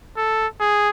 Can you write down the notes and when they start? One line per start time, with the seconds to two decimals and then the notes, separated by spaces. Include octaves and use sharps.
0.17 A4
0.60 G#4